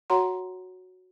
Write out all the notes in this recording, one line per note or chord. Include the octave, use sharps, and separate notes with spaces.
F#4 C#5 F#5 A#5 C6